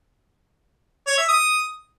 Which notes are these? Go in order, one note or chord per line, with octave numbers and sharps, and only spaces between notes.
C#5
E5
D#6